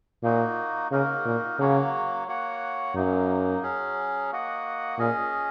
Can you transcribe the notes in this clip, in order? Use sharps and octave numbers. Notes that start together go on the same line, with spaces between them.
A#2 A#3 D#4 F#4
C#3 A#3 D#4 F#4 A#4
A#2
C#3 F#3 A#3 F#4 C#5
A#3 F#4 C#5 F#5
F#2 F#3 A#3 D#4
F#3 C#4 G#4
A#3 F#4 D#5 F#5
A#2 C#4 G#4 D#5